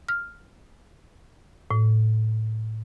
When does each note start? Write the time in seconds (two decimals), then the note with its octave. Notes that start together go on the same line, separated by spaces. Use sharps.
0.09 F6
1.71 A2